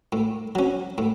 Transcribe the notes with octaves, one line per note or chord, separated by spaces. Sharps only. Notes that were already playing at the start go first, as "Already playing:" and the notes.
A2
F#3 C#4
A2